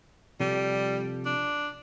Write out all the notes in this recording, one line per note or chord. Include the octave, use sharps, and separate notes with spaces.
C3 F3 G3 A4
D4